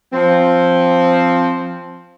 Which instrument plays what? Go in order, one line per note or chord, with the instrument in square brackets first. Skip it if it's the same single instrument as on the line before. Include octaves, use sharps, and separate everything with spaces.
[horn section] F3 C4